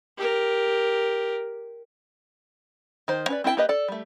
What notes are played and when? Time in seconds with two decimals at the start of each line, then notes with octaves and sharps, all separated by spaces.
0.18 G4 A#4
3.08 D#3 C5
3.28 C#4 B4 D5
3.44 C4 E4 F4 G5 A5
3.57 A#3 G4 B4 D#5
3.69 A4 D5
3.88 G3 A3